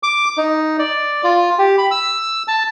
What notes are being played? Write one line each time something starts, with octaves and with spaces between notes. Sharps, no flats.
D6
D#4
D5
F4
G4
B5
E6
A5